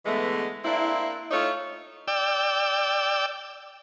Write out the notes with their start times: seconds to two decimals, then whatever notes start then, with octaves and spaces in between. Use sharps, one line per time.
0.06 D3 E3 G#3 A3 B3
0.65 A#3 C4 D4 E4
1.31 A3 D#4 F4 C#5
2.08 D5 G5 E6